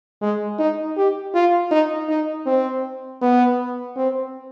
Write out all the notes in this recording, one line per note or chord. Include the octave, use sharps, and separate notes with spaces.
G#3
D#4
G4
F4
D#4
D#4
C4
B3
C4